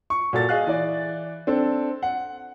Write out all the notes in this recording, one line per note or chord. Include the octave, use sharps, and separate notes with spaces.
C#6
A#2 F#4 A4 A6
G#4 D#5 F5 F#6
E3 D5
C4 D4 A4
F#5